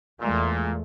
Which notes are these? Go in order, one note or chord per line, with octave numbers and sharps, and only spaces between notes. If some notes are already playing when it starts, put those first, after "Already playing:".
E2 A#2 G#3 A3